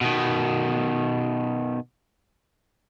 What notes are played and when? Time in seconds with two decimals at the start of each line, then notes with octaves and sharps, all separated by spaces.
0.01 B2 D#3